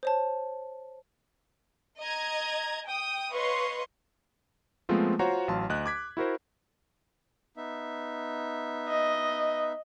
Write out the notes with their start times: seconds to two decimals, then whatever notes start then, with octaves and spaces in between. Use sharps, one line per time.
0.03 C5 C#5 A5
1.99 D#5 A#5 G#6
2.86 G5 D#6
3.31 B4 C#5 D#5 F5 C6 C#6
4.89 F3 G#3 A3 B3 C4 F4
5.19 F4 F#4 C5 C#5 F#5 A#5
5.48 A1 F#3 F5 A5 C6
5.69 D2 D#5 F#6
5.86 D6 G#6 B6
6.17 E4 F#4 A#4 C5
7.57 B3 D#4 E5
8.89 D#5